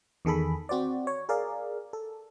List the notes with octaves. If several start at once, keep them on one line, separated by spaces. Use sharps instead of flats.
E2 D#3 G#4 A4 B5
C4 F#4 C5 D5
C#5
G#4 A#4 D5 F5
A4